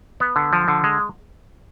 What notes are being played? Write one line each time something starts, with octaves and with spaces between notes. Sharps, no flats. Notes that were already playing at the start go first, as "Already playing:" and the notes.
B3
D3
F3
D3
G#3